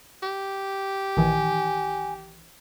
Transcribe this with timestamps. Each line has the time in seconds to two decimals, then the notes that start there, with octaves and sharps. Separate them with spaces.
0.23 G4
1.17 A#1 D#3 E3 G#5